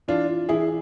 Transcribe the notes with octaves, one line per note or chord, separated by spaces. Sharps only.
E3 D4 F4
E3 E4 G#4